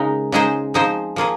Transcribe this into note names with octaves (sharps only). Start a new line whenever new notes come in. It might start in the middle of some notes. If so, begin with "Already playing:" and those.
Already playing: C#3 G#3 D#4 A#4
C#3 G#3 D#4 G#4 C5
F3 C4 D#4 G#4 C5
F3 A#3 F4 G#4